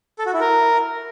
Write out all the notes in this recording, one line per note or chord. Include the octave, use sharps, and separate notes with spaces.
A4
F#4
E4
A#4